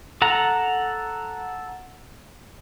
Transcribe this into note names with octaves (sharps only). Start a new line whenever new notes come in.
A4 F#5 A#5